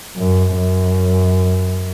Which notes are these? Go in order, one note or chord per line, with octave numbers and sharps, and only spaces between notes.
F#2
F#2